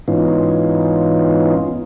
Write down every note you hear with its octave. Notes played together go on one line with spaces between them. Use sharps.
G#2 E3 B3 C#4 D#4 F4